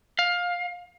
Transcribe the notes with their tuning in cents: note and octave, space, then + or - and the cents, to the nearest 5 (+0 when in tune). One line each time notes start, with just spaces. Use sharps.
F5 +15